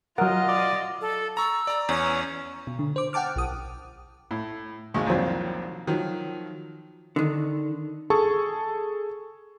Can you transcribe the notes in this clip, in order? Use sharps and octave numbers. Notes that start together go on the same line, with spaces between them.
F#3 F4 A#4 D#5 F#5
D5
A4
A#5 C#6 E6
D5 A#5
E2 C#4
B2
D3
C5 D6
F#5 G5 A5 D6 F6
B1 D#6
A2
G#1 D#2 G#3 C#6
C2 F2 A#2 D#3 F#3 C4
D#3 F3 F#3
D3 D#3
G#4 A4 A5 C#6